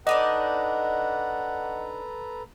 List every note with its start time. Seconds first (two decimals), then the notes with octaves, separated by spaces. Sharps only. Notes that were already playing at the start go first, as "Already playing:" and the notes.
0.07 D4 D#4 A4 B4 D5 D#5 F#5 A#5